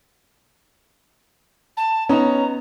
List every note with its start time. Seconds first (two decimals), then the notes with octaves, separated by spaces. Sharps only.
1.77 A5
2.09 B3 C#4 D#4 A#5